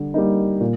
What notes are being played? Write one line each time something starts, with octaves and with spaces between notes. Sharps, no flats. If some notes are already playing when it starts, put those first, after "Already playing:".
Already playing: D3 G3
G3 A#3 D#4
A#2